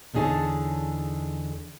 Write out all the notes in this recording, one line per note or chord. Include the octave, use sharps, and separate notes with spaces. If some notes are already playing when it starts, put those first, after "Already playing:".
E2 D3 D#4 G#4 C#5 A5